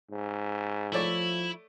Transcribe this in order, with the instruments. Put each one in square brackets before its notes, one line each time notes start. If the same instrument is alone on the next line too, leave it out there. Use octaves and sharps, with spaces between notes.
[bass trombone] G#2
[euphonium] F3 [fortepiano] A3 C#5 D5 [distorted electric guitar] E4